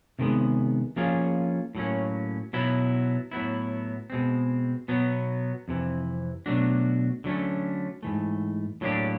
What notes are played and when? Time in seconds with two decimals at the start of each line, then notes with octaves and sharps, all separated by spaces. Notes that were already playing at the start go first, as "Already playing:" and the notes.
0.19 C3 D#3 G#3 B3
0.96 F3 A#3 C#4 F4 G#4
1.75 A2 F#3 A#3 C#4
2.53 B2 F#3 B3 E4
3.31 A2 F#3 B3 E4
4.10 B2 G#3 C4
4.88 B2 F#3 B3
5.68 F2 C3 E3
6.46 B2 F#3 A3 D4 F#4
7.24 D3 F#3 A3 C#4
8.03 G#2 E3 A3
8.81 A2 F#3 A#3 D4 G4